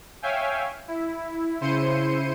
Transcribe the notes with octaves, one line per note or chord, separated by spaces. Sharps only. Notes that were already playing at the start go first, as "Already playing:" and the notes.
C#5 E5 F5 G5 G#5
E4
C#3 E4 C5 C6 C#7 D#7